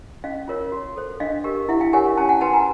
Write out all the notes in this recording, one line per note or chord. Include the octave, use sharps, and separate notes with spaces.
C#4 D#5 F5
F4 A#4 C#5
F#4
A4 C5
D4 D#5 F5
G4 A#4
E4 E5 F#5
F5 G5
G4 A#4 C#5 F#5 G#5
C#4 G5 A5
F#5 G#5
F#4 B4 G5 A5
G#5 A#5